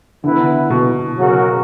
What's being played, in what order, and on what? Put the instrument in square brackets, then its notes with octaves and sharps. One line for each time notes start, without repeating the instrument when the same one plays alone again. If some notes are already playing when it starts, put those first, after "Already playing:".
[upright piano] D3 [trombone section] E3 B3 E4 B4
[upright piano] B2
[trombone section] C#3 F#3 C#4 F#4 A#4